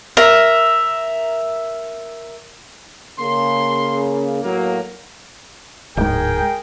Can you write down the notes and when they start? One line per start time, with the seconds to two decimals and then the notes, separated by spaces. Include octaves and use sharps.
0.17 A#4 E5
3.19 C#3 A#3 C6
4.44 A2 F#3 A#3
5.97 D1 G#2 G#4 A#4 G5